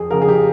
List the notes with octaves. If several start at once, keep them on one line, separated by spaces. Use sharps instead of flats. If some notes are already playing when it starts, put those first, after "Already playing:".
Already playing: F2 G#4
C#3 F3 A#4
G#4
G4